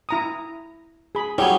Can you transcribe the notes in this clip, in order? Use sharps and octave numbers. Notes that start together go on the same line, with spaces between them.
E4 A#5 D#6
G#4 B5
F#3 G3 E4 G#4 C#5